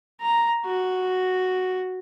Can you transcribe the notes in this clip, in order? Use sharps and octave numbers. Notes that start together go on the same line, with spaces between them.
A#5
F#4